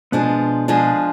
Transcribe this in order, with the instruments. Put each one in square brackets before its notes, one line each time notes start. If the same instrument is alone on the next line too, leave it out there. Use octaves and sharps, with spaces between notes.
[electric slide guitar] B2 B3 [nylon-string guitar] F3 G#3 D4 G#4
[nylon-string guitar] F3 G#3 D4 G#4